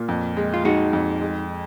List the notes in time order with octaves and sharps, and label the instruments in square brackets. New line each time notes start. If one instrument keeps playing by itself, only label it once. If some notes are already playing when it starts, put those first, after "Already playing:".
Already playing: [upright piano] A#2 [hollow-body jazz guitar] F4
[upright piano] F2
G#3
[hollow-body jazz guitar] F4
[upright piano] G#3 [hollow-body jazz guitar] D#4 F#4
[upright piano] F2
G#3